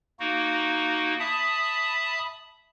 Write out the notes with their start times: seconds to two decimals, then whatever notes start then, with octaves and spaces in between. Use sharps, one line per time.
0.20 A#3 D#4 F#4
1.20 E5 A5 B5 D#6